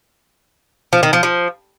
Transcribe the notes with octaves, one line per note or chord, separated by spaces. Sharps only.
F3
D#3
F3
F3